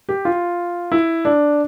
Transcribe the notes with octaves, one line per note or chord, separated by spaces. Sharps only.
G4
F4
E4
D4